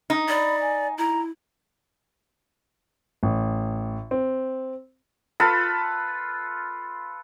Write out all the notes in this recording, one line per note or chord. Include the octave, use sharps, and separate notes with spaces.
D#4
D5 B5
G#5
E4 A#5
A1
C4
F4 A4 B4 B5